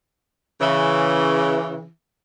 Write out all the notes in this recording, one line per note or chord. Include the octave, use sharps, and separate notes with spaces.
C#3 E3